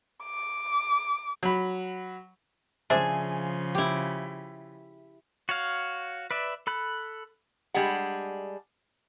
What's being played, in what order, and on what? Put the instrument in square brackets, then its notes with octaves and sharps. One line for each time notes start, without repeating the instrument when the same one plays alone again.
[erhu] D6
[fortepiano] F#3 B5
[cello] C#3 F3 [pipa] D4 C5 E5 [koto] G#4
[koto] E4 G4
[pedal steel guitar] F#4 C#5 F5
B4 D5 E5
A4 B5 F#6
[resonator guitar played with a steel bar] G3 G#3 D4 G#4 F#5